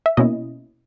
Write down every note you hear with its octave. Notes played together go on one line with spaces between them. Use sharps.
E5
B2 A#3 C#4 E4 D#5